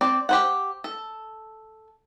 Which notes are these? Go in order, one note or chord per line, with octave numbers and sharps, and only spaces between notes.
C4 D5
G4 C5 F#5
A4